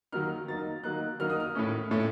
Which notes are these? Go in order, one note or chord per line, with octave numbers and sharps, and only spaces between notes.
D#3 F#3 A#3 D#4 F6
D#3 F#3 A#3 D#4 A6
D#3 F#3 A#3 D#4 F#6
D#3 F#3 A#3 D#4 F6
D#6
F6
A2 A3 C#4
A2 A3 C#4